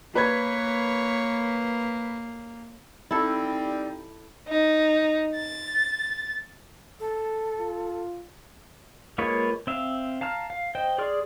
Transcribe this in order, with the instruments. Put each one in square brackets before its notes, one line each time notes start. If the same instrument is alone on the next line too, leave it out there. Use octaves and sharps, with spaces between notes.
[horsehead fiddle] A#3 [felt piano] B4 B5 G#6 [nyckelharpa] C#5
[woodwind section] G3 C4 D#4 [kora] E4 A4
[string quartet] D#4
A6
[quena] A4
[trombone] F4
[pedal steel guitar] G#3 A#3 F4 B4 C#5
C4 E5 F5
F5 A5 A#5 F6
F5
C5 D#5 G5
G#4 D5 C6 F6